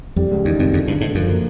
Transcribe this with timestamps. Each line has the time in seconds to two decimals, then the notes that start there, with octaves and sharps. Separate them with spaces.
0.16 F2 G3
0.31 C#2
0.45 E2 D#3
0.58 F#2 C3
0.72 F2 D3
0.88 G2 D3
1.00 G#2 A3
1.15 F#2 F3
1.30 A#3